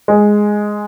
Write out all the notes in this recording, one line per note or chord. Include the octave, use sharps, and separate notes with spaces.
G#3